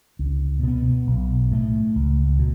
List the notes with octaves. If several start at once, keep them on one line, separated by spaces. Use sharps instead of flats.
C#2
B2 B3
B1
A2 A3
C#2
B2